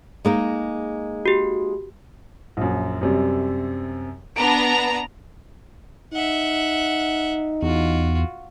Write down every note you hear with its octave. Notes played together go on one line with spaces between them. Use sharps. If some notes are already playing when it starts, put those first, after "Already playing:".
G#3 A#3 D#4
F#4 G4
A#1 F#2
F#2 C3 G3
B3 D4 A#5 D7
D#4 E5 F#5
E2 F4 F#4